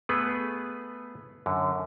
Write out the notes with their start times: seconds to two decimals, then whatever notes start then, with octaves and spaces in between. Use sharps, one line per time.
0.09 A3 B3 G#4 B4
1.46 F#2 D3